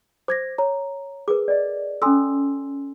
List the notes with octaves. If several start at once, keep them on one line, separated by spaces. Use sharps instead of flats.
C5 D6 G#6 A#6
C#5 A#5
G#4 A#4 B4 D6
D5 D#5
C#4 A4 G#5 C6 E6